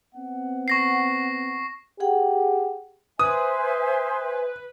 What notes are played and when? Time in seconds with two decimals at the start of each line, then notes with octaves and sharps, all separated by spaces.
0.15 B3 C4 F#5
0.68 C#6 A#6 C7
2.00 G4 G#4 F#5 G5
3.19 B4 C5 E5 G#5 D#6